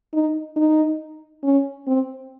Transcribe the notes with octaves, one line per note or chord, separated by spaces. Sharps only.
D#4
D#4
C#4
C4